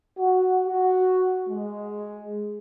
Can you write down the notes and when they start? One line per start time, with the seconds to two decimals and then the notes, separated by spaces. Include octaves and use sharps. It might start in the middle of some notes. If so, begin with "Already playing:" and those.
0.18 F#4
0.67 F#4
1.49 G#3